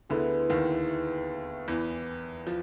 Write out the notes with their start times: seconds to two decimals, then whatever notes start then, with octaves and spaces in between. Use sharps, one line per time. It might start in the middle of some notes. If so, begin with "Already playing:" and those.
0.09 D2 D3 B3 E4 G#4
0.50 D#2 D#3
1.68 E2 E3
2.47 F3